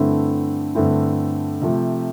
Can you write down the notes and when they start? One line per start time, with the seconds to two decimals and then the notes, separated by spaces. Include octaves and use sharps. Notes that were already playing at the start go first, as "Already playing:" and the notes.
Already playing: G2 D3 A3 C4 E4
0.75 G2 D3 A3 C4 E4
1.62 C3 F3 A3